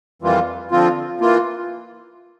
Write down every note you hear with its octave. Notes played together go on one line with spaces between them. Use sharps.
F2 E3 G3 A#3 F4
D3 F3 C4 F4
E3 A#3 F4